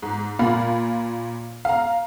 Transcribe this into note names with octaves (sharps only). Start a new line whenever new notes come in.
G#2
A#2 F5 B5
F5 A#5